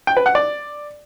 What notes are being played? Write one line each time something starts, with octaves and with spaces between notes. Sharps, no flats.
G5
B4
F#5
D5